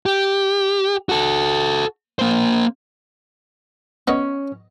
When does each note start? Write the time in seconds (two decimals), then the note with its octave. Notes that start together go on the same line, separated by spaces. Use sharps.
0.06 G4
1.09 F#4 A4
2.19 A#3 C5
4.08 B3 C#4 D#5